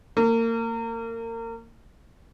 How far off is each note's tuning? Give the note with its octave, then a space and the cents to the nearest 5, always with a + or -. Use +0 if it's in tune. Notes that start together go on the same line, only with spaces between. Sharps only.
A#3 -30